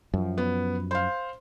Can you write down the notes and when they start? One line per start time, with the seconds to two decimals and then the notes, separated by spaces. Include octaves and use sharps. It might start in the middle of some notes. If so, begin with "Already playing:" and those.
0.14 F#2 F3
0.38 B3
0.91 C5 F5